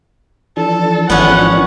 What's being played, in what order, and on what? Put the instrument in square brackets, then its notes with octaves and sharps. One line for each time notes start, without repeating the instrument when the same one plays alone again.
[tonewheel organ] E3 F3 D4 [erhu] A4
[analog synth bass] G#1 [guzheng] B3 C#4 [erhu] F#5